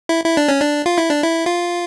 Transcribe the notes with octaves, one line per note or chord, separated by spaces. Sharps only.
E4
E4
D4
C#4
D4
F4
E4
D4
E4
F4